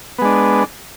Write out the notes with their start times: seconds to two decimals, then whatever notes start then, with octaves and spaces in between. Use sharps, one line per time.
0.18 B3
0.22 G#3
0.25 D4